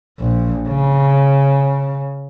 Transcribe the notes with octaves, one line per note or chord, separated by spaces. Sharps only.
A#1
C#3